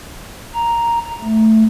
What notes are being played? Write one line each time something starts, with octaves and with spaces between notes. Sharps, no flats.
A#5
A3